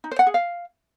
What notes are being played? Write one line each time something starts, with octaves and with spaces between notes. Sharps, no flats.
D#4
C5
F#5
G#4
F5